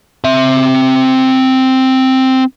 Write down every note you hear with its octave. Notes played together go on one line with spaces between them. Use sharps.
C4 E5